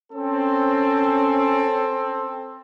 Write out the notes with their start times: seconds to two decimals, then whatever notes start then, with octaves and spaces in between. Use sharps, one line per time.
0.13 C4 C#4 A4